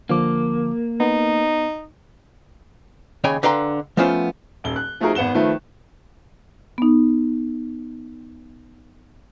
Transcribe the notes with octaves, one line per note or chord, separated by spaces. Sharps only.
D3 F3 A#3 D6
B3 D#4
D#2 C#3 C#5 G5 G#5 B5
D3 B4 F5 G5 A#5 C6
F3 A3 B3 C#4 F4 C5
D#1 G7
F#6
F3 A3 D#4 F#4 G#4 A#4
G#1 B3 F#5 E7 G7
D#3 F3 A3 B4
B3 D#4